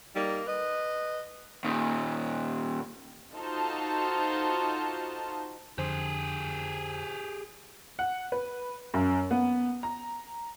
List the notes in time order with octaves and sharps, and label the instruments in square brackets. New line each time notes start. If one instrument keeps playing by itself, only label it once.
[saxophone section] G3 A#3 D#4
B4 D#5
[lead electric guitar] A#2 D#3
[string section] D#4 F4 F#4 A4 C5 A5
[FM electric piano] F2 D3 C5 [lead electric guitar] G4 G#4
[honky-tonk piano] F#5
B4
F#2
B3
A#5